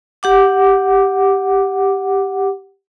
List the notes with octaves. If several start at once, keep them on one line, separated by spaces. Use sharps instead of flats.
G4 F#5 D6